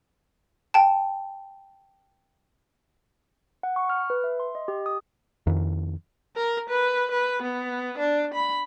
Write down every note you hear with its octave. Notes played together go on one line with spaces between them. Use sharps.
G5 A5
F#5
C#6
F6
B4
E5
C6
D#5
G4
D#6
F2 D#3
A#4
B4
B4
B3
D4
B5